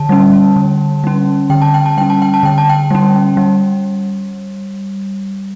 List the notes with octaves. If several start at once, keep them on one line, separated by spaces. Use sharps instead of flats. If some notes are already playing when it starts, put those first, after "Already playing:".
Already playing: D3 A5
G3 C#4
D3
G3 C#4
D3 G5
A5
G5
A5
G3 C#4 G5
A5
G5
A5
D3 G5
A5
G5
G3 C#4
G3